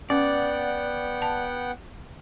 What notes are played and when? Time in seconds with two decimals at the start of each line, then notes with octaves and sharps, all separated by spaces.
0.10 B3 C#4 D5 F#5 G5
1.22 A5